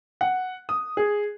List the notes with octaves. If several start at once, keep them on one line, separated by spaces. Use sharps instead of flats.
F#5
D#6
G#4